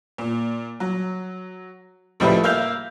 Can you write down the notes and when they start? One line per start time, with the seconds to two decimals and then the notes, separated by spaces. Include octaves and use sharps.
0.18 A#2
0.80 F#3
2.20 C#2 A2 F3 G3 E4 B4
2.44 A#3 E5 F5 G6 F7